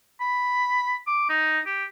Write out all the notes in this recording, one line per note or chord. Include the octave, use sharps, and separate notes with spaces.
B5
D6
D#4
G4